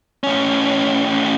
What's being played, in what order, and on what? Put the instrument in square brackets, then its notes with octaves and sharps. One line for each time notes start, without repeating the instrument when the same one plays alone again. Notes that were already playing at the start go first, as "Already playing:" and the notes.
[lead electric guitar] A2 C#4